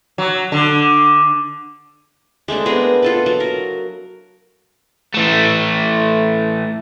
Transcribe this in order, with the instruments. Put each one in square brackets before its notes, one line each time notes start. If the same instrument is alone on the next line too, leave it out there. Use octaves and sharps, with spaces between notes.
[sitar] F#3
D3
[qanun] G#3 A3 C4 D4
B3 C4 G#4 A#4
F4 A4 B4
F#3
A#4
[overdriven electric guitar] E3 A3